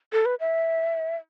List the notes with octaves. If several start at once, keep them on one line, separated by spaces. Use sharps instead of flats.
A4
B4
E5